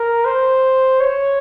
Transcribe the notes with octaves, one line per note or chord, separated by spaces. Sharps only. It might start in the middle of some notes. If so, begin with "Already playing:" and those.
Already playing: A#4
C5
C#5